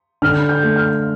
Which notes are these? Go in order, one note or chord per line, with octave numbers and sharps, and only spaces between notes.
D3 F6
G6
A3
F6